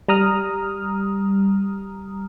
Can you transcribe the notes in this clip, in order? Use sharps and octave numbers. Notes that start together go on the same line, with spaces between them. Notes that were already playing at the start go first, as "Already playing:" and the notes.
G3 A#5 D#6 F6